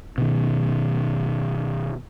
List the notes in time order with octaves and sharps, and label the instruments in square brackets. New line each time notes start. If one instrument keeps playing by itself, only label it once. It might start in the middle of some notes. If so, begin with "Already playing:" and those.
[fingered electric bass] B2 D#3